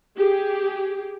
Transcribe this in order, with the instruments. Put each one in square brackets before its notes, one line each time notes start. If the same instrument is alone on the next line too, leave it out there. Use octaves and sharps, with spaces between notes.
[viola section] G4 G#4